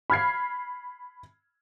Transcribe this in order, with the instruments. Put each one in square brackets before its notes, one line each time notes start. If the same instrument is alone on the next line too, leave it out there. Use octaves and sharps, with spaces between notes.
[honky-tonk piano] B5 F6 G#6 C7